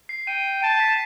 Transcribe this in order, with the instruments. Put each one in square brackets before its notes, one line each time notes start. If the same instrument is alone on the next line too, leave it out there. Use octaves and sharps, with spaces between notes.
[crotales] C7
[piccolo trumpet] G5 [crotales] D#7
[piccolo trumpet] A5 [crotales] D#7
[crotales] B6